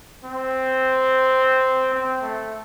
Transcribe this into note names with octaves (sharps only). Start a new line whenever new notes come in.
C4
C4
A3